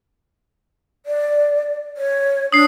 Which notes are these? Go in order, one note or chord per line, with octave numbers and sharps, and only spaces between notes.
D5
C#5
D4 D#6 C7